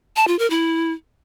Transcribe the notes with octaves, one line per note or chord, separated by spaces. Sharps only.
A5
F4
A#4
E4